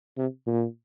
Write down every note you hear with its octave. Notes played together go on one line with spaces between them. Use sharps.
C3
A#2